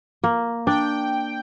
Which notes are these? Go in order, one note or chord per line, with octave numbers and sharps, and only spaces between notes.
A#3
D4 G5